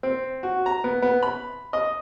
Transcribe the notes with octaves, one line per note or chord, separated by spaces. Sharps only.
C4
F#4
A#5
B3
B3
B5
D#5